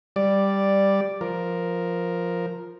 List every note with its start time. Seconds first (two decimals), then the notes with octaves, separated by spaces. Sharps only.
0.16 G3 D5
1.21 F3 A#4